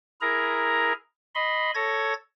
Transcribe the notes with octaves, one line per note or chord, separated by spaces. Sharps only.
E4 G#4 A#4 A#5
D#5 B5 C6
A4 C#5 G#6 A#6